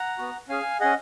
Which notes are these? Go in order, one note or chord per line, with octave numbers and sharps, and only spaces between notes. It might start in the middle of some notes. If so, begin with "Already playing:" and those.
Already playing: F#5 A#5
B3 F#4
C#4 G#4 F5 G#5
C#4 G#4 D#5 F#5